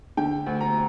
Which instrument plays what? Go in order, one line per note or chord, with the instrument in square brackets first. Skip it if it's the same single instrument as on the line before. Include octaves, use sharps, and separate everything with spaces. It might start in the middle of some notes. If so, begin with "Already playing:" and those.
[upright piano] D3 G5
D2
A#5